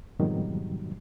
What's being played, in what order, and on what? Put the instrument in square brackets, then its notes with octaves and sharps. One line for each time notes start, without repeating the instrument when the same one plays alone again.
[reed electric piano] F2 G#2 B2 D#3 F#3 G3